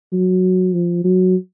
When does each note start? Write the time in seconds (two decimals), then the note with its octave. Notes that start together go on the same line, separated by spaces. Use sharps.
0.13 F#3
0.73 F3
1.04 F#3